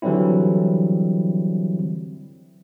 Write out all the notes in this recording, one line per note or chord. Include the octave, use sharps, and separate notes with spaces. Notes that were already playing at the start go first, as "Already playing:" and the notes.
D3 E3 F#3 G3 C4 E4